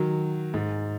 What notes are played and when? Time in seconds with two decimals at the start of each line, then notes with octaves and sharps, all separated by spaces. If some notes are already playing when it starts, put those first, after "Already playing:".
Already playing: D#3 F#3
0.54 G#2